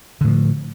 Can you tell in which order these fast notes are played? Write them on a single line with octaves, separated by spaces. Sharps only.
D3 A2 F3